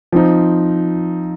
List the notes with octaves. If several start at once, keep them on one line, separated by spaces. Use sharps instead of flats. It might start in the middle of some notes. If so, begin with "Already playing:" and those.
F3 C4 D#4